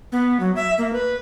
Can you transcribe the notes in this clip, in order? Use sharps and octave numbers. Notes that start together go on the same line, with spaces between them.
B3
F#3
E5
A#3
B4